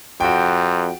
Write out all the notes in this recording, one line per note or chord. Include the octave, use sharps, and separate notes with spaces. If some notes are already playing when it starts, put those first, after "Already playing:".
F2 F#4 G5